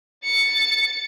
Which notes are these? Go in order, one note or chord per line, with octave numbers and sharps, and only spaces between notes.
A6 C#7